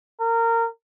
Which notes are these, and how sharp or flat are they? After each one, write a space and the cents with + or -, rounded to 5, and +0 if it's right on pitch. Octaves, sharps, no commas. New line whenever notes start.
A#4 -20